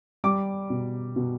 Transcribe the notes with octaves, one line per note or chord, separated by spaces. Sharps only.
G3 D6
B2
B2